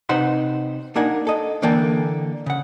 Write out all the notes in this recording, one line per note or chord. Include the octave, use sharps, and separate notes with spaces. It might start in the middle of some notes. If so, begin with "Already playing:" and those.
C3 D#4 B4 C5 F#5 C6
A#3 D4 D#4 A#4 F#5 G#5
A4 D#5
D3 E3 A#3 A4 G5 A5
C#3 F#5